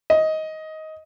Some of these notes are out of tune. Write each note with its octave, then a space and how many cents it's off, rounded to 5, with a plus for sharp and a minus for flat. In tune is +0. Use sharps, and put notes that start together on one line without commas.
D#5 +15